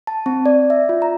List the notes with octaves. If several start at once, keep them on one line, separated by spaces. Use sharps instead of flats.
A5
C4
D5
E5
F4
A#5